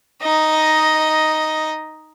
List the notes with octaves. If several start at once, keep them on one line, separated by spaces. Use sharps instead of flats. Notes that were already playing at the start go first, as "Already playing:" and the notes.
D#4 D#5